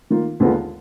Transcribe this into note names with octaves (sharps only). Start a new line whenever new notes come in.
D#3 A#3 F4
D#2 D3 G#3 B3 F4